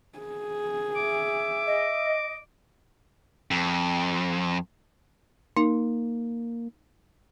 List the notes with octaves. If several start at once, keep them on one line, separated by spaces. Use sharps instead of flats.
G#4
E5 D6
D#5
F2
A#3 D#4